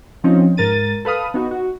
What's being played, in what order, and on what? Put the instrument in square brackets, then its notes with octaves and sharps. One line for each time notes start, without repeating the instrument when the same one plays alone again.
[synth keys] F3 C4 C#4 D#4
G#2 A#4 A6 D#7
A4 B4 F5 D#6
B3 D#4 F#4
F#4